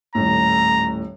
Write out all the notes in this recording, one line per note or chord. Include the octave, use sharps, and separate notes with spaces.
D#1 A2 A#5